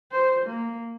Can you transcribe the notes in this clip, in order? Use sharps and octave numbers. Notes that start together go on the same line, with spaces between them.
C5
A#3